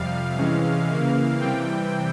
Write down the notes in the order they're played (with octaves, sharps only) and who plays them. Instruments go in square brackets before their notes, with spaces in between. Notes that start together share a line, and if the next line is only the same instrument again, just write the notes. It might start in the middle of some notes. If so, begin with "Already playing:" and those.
Already playing: [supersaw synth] F2 C3 G3 F5
C3 E3 G#3 C#4
C#3 E3 A#3
C3 E3 G3 C4 G5